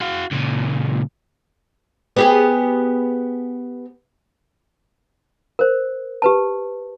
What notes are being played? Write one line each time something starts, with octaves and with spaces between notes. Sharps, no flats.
F#4 F5
C#2 A#2
B3 G4 G#4
A#4 C5
G4 B4 A5